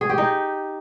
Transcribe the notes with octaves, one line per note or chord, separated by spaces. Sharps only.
G#4
G4
D#4